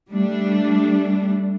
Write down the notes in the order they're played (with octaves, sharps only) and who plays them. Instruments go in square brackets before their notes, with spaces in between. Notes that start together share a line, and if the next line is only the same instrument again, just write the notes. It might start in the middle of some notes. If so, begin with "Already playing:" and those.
[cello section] G3 A3 D4